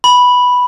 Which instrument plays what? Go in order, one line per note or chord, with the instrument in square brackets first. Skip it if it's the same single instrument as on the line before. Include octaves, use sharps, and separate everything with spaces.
[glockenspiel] B5